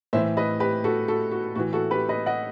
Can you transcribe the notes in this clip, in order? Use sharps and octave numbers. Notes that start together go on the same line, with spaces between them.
A2 E3 C5 E5
B4 D#5
G4 B4
F#4 A4
F#4 A4
F#4
A2 E3 F#4
F#4 A4
G4 B4
B4 D#5
D#5 F#5